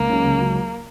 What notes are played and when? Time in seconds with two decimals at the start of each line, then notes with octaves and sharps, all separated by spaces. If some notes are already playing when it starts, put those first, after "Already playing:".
Already playing: C#2 A#3
0.09 C#3 F#3 C#4 F#4
0.24 C#2
0.39 C#3 F#3 C#4